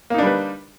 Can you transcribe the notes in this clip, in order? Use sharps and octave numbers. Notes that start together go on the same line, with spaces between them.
G3 A#3 D4 D#4 B4